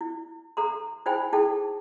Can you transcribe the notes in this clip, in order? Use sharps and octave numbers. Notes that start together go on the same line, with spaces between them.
E4
A4 A#5 C6
D#4 E4 C5 G5 G#5 B5
D#4 E4 G#4 A4 G5 A5